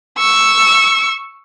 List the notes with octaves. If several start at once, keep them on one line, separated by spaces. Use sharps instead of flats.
C#6 E6